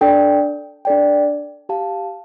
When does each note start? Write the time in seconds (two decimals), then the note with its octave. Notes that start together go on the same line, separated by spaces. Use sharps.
0.01 D4 A4 D5 G5
0.85 D4 A4 D5 G5
1.69 G4 F5 A5